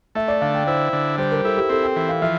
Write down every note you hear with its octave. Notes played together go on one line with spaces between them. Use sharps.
A3 E5
D5
D3 F5
G5
E4 C5
D3
G3 C5
A#4
E4 A4
G4
C4 A4
G5
E3
F5
F3 E5